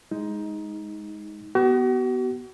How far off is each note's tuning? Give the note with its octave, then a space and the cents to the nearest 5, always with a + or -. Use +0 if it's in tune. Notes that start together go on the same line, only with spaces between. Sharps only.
G#3 +0 D#4 +15
B3 +0 F#4 +40